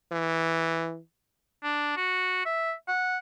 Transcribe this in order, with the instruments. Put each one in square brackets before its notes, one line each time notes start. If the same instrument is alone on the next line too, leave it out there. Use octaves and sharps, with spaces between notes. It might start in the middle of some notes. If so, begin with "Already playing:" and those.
[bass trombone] E3
[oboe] D4
F#4
E5
F#5